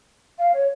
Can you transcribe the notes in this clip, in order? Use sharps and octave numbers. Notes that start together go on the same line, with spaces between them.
F5
C#5